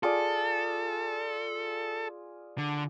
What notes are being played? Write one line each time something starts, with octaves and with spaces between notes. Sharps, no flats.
F4 G#4 A4 D5
D3